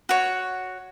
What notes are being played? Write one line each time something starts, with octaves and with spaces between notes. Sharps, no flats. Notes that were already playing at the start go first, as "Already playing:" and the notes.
F#4 C#5